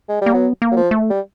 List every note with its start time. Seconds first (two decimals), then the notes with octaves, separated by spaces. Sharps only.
0.09 G#3
0.21 G3 A#3
0.33 F#3 B3
0.62 A#3
0.72 F#3
0.77 F3
0.91 A3
1.10 G3